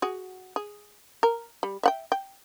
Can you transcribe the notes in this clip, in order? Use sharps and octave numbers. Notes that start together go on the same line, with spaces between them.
F#4 G#4
G#4
A#4
G3
E5 F#5 G5
G5